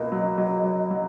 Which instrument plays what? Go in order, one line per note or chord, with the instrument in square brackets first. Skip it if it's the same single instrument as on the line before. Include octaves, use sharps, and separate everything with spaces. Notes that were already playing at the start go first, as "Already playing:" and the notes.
Already playing: [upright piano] C#2 B2 A#3 [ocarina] D#5
[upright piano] F#3
F#3
F#3
F#3